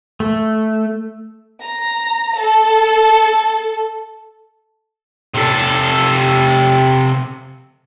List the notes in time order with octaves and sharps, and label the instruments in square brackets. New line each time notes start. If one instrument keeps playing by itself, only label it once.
[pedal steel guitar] A3
[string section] A#5
A4
[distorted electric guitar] C3 A4